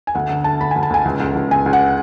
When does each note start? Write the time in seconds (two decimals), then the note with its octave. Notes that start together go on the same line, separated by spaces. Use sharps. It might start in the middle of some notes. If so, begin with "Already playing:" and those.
0.07 G#5
0.15 D2 F#5
0.29 D3 F#5
0.44 D3 A5
0.60 D2 B5
0.71 D2 G#5
0.83 A5
0.90 D2 G#5
1.05 C#2
1.20 C#2
1.35 C#2
1.51 C#2 G#5
1.66 C#2
1.73 F#5